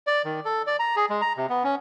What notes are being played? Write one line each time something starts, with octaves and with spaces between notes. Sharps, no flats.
D5
D#3
A4
D5
A#5
G#4
G#3
A#5
C3
B3
C#4